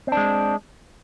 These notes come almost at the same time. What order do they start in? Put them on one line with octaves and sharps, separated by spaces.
C4 D4 G#3